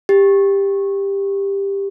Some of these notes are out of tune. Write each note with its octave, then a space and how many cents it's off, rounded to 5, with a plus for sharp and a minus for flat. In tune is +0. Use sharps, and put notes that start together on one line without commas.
G4 +15